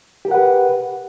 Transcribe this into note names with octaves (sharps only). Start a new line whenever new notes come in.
G4 A#4 B4 F#5